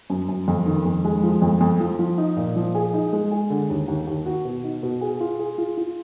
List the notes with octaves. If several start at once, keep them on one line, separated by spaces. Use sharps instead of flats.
F#2
F#2
F2
D#3
F2
G#3
F3
F2
F2
F3
F3
D#4
A#2
F3
G#4
D#4
G#3
G#4
D3
D#2
D#2
D#2
F#4
B2
D#4
B2
G#4
F4
G#4
F4
F4